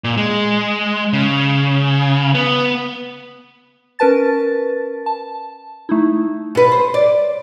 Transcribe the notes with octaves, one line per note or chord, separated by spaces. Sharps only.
A#2
G#3
C#3
B3
C#4 A#4 B4 A5 A6
A5
A3 D#4 E4
B2 B4
C5
D5